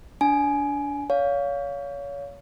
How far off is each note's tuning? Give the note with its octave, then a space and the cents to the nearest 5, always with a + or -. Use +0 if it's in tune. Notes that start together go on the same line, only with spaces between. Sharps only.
D4 -25 G#5 +20
C#5 +30 F5 +5